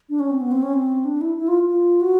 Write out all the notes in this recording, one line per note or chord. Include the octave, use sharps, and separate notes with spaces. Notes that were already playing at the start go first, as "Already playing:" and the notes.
D4
C#4
C4
B3
C4
C#4
C4
D4
E4
E4
F4
F4
F#4